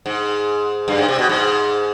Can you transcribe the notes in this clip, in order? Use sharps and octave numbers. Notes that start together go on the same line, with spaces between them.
G#2
G2
G#2
C3
B2
G#2